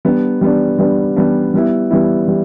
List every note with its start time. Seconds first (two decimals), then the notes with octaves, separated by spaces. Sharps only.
0.05 G3 B3 D4
0.41 G3 B3 D4
0.79 G3 B3 D4
1.16 G3 B3 D4
1.54 G3 B3 E4
1.91 G3 B3 E4
2.28 G3